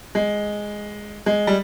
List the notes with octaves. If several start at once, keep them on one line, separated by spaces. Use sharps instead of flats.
G#3
G#3
G3